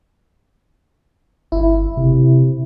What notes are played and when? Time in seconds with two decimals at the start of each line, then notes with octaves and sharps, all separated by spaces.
1.52 G1 E4
1.97 C3